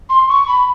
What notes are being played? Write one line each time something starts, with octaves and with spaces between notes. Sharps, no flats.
C6
C#6
B5